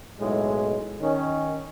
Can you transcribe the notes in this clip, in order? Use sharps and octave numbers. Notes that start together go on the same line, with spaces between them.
B1 A2 G#3
D#3 C#4